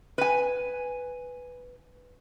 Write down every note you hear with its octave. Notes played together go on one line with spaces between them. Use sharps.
B4 G#5